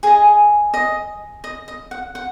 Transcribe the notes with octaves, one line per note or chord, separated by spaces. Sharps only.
G#4 D#5 G#5
D#5
D#5
D#5
F#5
F#5